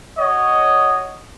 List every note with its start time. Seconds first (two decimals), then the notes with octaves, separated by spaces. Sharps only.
0.18 F#4 C#5 D#5